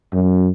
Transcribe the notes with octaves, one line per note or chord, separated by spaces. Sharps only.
F#2